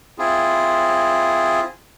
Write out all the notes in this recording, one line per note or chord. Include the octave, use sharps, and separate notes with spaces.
C4 E4 F4 G#4